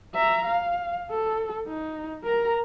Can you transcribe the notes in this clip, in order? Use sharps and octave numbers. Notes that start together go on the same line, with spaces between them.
E5 A#5
F5
A4
D#4
A#4 A#5